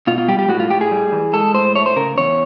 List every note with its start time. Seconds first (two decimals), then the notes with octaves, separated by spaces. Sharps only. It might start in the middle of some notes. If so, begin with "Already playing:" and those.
0.07 B2 F4
0.18 F4
0.28 G3 G4
0.39 G4
0.49 A2 F#4
0.60 F4
0.70 A2 G4
0.81 G#4
0.91 G3
1.12 E3
1.33 G#3 A4
1.54 A2 C5
1.75 A3 C#5
1.86 C5
1.96 C#3 A#4
2.18 E2 C#5